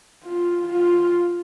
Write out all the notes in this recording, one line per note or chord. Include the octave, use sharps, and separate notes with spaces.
F4
F4